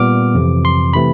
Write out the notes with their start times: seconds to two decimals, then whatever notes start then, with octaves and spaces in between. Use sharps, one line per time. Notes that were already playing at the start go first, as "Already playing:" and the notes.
Already playing: A#2 G3 B3 D6 F6
0.35 F2 C3 E3
0.65 C6
0.93 C3 E3 A3 C4 B5